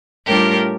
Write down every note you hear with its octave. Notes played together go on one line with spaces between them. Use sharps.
A2 G3 D4 F4 G4 A#4